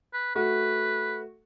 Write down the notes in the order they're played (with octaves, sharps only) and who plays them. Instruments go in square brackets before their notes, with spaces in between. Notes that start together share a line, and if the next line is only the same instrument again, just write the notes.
[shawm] B4
[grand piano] A3 F#4 [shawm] B4